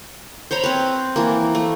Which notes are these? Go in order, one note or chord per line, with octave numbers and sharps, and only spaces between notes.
C5 C#5 A#5 B5
C4 B4
E3 A#3
A3